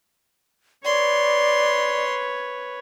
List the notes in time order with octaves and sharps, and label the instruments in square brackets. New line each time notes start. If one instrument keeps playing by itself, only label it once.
[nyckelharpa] B4 C#5 [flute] D5 [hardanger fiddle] C6